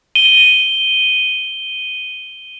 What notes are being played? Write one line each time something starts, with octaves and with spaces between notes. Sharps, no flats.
D#7 G7